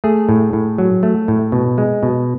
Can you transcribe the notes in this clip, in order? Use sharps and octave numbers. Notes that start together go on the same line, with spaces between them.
A3 G#4
A2
A2
F#3
A3
A2
B2
G#3
B2